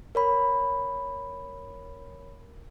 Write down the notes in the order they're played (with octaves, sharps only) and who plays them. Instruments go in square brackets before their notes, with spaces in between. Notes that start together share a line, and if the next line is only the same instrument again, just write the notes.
[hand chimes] A#4 C#5 B5